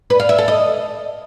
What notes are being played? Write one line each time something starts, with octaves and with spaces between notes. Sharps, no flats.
B4
F5
E5
A4
D#5